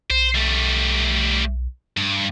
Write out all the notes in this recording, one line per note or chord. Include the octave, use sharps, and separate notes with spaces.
B1 C5
G3 A3
G2